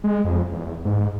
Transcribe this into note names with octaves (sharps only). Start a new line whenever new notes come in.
G#3
F2
E2
G#2